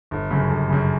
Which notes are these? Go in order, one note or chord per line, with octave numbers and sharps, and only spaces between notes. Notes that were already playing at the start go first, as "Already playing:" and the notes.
G1
F#2 C#3
G1
F#2 C#3